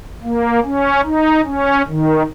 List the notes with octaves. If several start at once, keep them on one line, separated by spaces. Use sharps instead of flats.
A#3
C#4
D#4
C#4
D#3